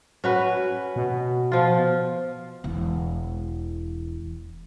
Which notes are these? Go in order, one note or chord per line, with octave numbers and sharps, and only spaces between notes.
C#4 F#4 B4
B2
F3 F4
E1 E3